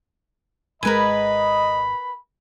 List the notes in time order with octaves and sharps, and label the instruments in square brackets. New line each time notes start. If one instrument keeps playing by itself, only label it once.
[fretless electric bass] G#1 G#3 [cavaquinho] A#4 B4 G#5 [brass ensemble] D#5 [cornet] B5